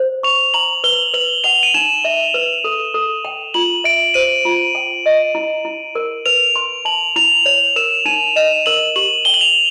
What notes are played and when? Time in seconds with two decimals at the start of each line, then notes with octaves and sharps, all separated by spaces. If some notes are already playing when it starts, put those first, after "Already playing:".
Already playing: C5
0.23 C#6 F7
0.54 A#5 F#7
0.84 B4 G7
1.14 B4 F#7
1.44 F#5 F7
1.63 D#7
1.74 D#4 E7
2.05 E5
2.34 B4
2.64 A4
2.94 A4
3.25 G5
3.54 F4 F#7
3.84 E5 D7
4.14 C5 D#7
4.45 F4
4.75 G5
5.06 D#5
5.35 E4
5.65 E4
5.95 A#4
6.26 B4 F7
6.56 C6
6.85 A5 F#7
7.16 E4 F7
7.46 C#5 F7
7.76 A#4 E7
8.05 D#4 D#7
8.36 D#5 E7
8.66 A#4 F#7
8.96 G4 F#7
9.25 G5 G7
9.34 F#7
9.41 F7